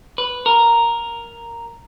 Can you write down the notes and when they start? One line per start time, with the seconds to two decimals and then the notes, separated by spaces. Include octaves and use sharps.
0.18 B4
0.46 A#4